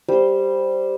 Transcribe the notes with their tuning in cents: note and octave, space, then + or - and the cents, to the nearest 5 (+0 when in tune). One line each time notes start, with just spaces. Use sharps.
G3 +0 C5 +0